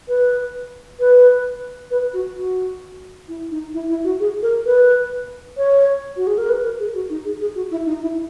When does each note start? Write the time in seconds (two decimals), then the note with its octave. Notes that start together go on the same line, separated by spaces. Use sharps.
0.08 B4
1.00 B4
1.91 B4
2.14 F#4
2.37 F#4
3.28 E4
3.51 D#4
3.74 E4
3.89 E4
4.04 F#4
4.20 G#4
4.42 A#4
4.66 B4
5.57 C#5
6.17 F#4
6.27 G#4
6.38 A#4
6.49 B4
6.64 A#4
6.79 G#4
6.95 F#4
7.10 D#4
7.25 G#4
7.41 G#4
7.55 F#4
7.71 E4
7.86 D#4
8.01 E4